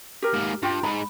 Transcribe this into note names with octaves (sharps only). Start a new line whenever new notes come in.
G4 A#4
G#2 A#3
G2 F4 G4
G#2 G#3 B5